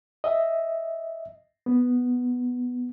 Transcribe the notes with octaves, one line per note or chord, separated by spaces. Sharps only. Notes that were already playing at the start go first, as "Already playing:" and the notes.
D#5 E5
B3